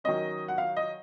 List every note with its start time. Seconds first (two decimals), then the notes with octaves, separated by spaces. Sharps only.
0.04 D#3 F#3 C#4 D#5
0.48 F#5
0.58 F5
0.76 D#5